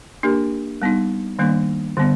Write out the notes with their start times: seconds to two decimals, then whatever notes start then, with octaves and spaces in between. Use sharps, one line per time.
0.23 A#3 D4 G4 A#4
0.82 G3 B3 D#4
1.39 D#3 G3 A#3 D4
1.97 D3 G3 B3